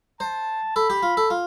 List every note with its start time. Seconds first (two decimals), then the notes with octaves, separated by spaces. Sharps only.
0.20 C5 A5
0.76 A4 B5
0.90 G4
1.03 F4
1.17 A4
1.30 F4